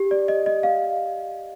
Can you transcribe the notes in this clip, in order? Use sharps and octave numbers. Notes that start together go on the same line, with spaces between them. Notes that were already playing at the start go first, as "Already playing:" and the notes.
Already playing: G4
D5
D#5
D#5
F5